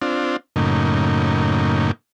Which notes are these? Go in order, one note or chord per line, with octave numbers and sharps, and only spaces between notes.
C4 D4 F4
F#2 A2 C#3 A#3 D#4